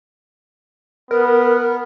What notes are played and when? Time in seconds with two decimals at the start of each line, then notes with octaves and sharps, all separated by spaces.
1.11 B3 A#4